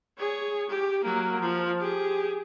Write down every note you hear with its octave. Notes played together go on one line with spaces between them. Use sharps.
G#4 C#5
G4
F#3 A#3
F3
G4 G#4